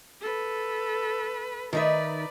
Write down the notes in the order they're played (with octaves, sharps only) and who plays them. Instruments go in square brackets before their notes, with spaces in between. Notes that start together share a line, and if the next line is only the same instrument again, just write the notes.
[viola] A4 B4
[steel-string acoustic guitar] D#3 D#4 E5 [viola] B4 D5